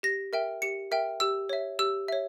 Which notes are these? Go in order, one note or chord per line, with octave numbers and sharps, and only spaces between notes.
G4 A#6
A#4 E5 G5
G4 C#7
A#4 E5 G5
G4 E6
C#5 E5
G4 E6
C#5 E5